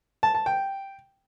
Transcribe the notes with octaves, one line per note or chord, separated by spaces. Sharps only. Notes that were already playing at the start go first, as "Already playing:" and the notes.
A5
A5
G5